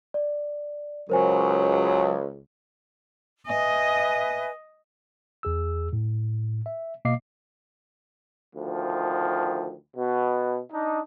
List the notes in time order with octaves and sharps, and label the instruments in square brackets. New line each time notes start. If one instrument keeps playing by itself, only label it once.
[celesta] D5
[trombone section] C#2 [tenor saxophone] F#3 [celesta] A#4 C5 G#5
[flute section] B4 E5 G#5 [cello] D#5
[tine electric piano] E2 G#4 E6
A2
E5
B2 A#3 D#5 F5 D6 C7
[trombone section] D2 D#3 F3
B2
D4 D#4